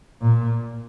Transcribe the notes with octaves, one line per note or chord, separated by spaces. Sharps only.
A#2